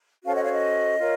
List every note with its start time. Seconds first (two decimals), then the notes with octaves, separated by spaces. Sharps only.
0.24 C#4 F#4 A4 C5 F5 A5
0.33 D#5 F#5
0.43 C#5 F5
0.52 D#5
0.99 F4 A#4 C#5